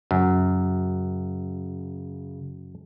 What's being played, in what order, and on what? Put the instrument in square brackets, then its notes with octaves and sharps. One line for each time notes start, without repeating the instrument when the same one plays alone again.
[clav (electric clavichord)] F#2 [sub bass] C#3